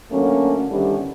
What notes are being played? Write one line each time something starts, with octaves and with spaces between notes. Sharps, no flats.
D3 F#3 A3 A#3 C#4
D3 D#3 G3 B3 C#4 E4